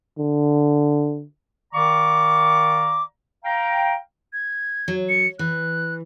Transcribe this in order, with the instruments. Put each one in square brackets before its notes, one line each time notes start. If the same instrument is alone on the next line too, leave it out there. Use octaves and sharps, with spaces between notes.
[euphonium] D3
[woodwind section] D#3 D5 F5 A#5 C#6 D6
F5 G5 A#5
[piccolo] G#6
[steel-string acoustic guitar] F#3
[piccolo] C#7
[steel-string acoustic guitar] E3 [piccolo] F#6